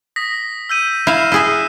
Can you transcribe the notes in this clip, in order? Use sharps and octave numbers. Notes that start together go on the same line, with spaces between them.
D#6 A#6 B6
E6 G6 D#7
E4 F5 F6 C7 E7
E4 G#4 E5 E6 F#6